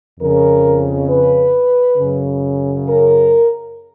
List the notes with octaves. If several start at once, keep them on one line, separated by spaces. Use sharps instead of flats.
F2 C#3 A#4
B4
F#2 C#3
A#4